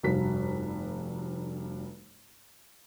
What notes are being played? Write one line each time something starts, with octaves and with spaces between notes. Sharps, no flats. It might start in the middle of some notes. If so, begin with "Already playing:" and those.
F1 G2 F#4 B6